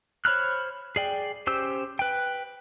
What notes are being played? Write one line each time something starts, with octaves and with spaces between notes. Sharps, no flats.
C5 C#5 B5 F6 F#6
G#4 D5 G5
C#4 G4 C5 E6
B4 G5